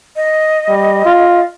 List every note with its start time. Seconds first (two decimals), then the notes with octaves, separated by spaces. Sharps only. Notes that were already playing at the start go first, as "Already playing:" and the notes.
0.16 D#5
0.69 G3
1.05 F4